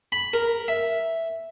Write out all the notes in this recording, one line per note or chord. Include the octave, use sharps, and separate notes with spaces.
B5
A#4
E5